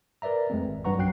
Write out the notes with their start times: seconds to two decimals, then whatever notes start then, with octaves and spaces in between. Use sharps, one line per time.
0.22 A#4 B4 D5 E5 A#5
0.50 F2 G#3 A3 C4
0.66 G#1
0.84 G2 F#3 B4 F#5 A#5 C#6
0.98 A#1 F#2 F#3 G5 F#6 C7